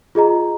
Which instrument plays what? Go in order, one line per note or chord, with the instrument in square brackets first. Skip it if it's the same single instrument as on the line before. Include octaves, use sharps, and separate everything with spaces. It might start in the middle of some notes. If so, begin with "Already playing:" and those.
[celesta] F4 G#4 D#5 A#5